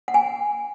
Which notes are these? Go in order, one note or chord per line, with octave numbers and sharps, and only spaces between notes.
F#5
G#5